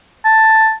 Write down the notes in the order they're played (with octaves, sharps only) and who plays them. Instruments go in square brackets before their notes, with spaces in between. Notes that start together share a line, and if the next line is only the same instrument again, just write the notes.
[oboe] A5